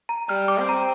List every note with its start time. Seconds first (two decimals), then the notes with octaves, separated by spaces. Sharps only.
0.09 A#5
0.29 G3 F6
0.48 D6
0.58 C4
0.69 A#5